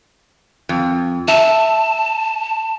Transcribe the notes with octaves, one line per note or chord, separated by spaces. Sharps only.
F2
E5 A5